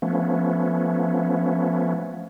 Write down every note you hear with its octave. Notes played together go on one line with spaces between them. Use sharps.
F3 A3 B3 C#4